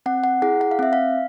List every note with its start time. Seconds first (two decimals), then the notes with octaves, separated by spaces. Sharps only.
0.06 C4 F#5
0.24 F#5
0.42 E4 G#4 F#5
0.61 F#5
0.71 F5
0.79 C4 E5
0.93 F5